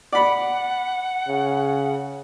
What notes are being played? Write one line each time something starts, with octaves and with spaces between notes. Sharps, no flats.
D5 F#5 B5
C#3